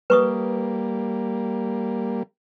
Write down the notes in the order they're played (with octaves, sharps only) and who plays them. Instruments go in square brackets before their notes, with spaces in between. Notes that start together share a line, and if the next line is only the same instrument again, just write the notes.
[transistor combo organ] G3 A#3 [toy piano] B4 C#6 D#6